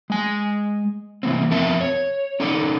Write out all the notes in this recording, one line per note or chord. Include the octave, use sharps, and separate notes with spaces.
G#3 G#5
C3 E3 A#3 C4
F2 B2 C4 A#4 E5 A5
C#5
C#4 D#4 A4 D5